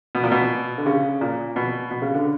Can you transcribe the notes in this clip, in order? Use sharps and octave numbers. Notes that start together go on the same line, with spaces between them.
B2
A#2
B2
D3
C#3
A#2
B2
B2
C#3
D3